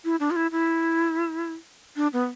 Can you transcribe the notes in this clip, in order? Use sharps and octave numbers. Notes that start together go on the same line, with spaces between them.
E4
D4
F4
E4
E4
D4
B3